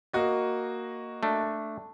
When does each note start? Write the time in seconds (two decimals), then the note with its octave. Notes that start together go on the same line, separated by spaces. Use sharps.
0.13 A#3 F#4 D#5
1.23 A3 D4